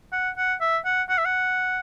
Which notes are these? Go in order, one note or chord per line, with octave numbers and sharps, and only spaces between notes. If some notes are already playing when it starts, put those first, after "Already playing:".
F#5
F#5
E5
F#5
F#5
E5
F#5